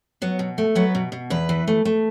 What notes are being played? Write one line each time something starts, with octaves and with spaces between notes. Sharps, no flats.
F#3 B3
B2
A3
F#3 B3
B2
B2
E2 B4
E3
A3
A3